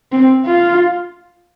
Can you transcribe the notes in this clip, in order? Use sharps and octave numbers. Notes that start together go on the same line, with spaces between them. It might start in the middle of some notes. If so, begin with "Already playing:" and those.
C4
F4